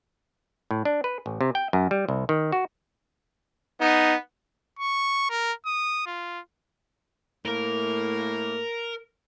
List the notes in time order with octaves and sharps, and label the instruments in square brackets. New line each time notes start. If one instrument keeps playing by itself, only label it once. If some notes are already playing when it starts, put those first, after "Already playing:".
[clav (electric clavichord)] A2
D4
B4
A1
C3
G5
F#2
G3
C2
D#3
F#4
[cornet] B3 [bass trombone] D#4
[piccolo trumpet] C#6
A#4
D#6
F4
[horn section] A2 A3 A#3 [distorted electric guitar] A#4